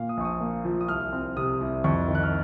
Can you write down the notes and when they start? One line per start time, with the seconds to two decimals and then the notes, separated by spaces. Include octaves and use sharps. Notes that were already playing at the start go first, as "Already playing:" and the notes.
Already playing: A#2 F5
0.09 D#6
0.17 A#1 C#6
0.25 D#6
0.41 A#3
0.65 F3
0.81 D#6
0.88 C2 F6
1.13 C4
1.37 C3 D#6
1.61 C2
1.84 F2 C#6
2.08 D#3
2.15 F#6
2.23 F6